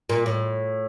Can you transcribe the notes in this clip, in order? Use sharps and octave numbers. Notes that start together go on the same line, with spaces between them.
A#2
A2